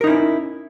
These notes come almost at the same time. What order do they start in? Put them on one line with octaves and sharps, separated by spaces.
A#4 D#4 E4 C#4